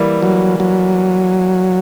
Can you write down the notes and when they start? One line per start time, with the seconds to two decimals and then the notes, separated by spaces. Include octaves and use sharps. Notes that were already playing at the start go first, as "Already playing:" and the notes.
Already playing: E3 G3 A#3
0.23 F#3
0.60 F#3